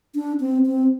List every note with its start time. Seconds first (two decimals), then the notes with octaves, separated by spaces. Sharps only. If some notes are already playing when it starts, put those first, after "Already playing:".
0.15 D4
0.40 C4
0.66 C4